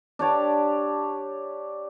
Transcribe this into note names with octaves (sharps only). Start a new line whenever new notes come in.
D4 G4 C#5 A5